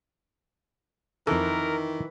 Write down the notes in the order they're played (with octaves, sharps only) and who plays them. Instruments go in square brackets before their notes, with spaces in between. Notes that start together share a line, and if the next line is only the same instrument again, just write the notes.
[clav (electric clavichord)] F2 A4 [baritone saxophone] D#3 [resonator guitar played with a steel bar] E3 [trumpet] A#4